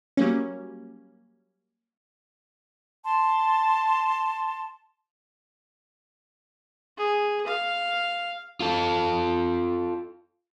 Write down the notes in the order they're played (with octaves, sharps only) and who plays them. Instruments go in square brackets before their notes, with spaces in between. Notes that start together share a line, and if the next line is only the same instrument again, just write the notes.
[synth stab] F#3 G3 A#3 C#4
[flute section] A5 C6
[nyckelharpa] G#4
F5
[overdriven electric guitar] F4 A4